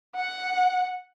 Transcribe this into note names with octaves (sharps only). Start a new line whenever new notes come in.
F#5